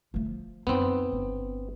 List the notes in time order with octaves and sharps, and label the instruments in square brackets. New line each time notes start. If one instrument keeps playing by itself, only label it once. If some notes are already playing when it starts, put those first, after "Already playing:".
[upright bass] F3 A3
F3
[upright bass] F#2 D#4 [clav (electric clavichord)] B3 C4
[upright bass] G1